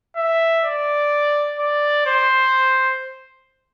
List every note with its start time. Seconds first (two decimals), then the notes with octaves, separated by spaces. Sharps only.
0.17 E5
0.65 D5
1.59 D5
2.07 C5